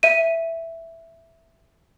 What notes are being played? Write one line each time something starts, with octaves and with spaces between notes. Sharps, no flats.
E5 D#7